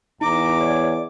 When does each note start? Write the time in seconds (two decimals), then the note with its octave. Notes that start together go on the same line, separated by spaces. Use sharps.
0.21 E2 D#4 A#5 D6
0.60 C#5 D5